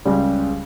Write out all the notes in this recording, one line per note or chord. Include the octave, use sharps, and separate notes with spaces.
C#2 C#3 G3